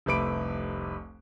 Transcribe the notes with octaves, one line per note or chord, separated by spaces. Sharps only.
F1 C2 A3 B4 D6 D7